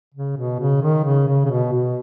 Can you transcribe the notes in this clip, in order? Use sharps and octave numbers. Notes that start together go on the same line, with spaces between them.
C#3
B2
C#3
D#3
C#3
C#3
C#3
B2
B2